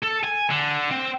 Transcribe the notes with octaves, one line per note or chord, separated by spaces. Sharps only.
A4
G#5
D3
C4